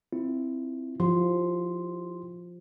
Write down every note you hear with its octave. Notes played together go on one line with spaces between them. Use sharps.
C4 E4 F4
F3 E4 G4 C6